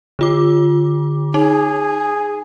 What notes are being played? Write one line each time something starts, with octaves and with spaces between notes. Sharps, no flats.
D3 F4 D6
D#4 G#4